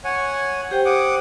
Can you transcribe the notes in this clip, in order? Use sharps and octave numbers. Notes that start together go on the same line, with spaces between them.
C#5 F#5 G#5
G4 C5 G5
F#5 D6 D#6